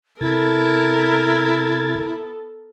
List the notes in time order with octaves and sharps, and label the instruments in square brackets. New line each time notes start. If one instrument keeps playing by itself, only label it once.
[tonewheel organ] C3 G#6 A6 [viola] B3 A4 [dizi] E4 [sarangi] A#4